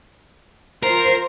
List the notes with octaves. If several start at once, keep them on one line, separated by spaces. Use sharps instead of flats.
F4 A#4 C5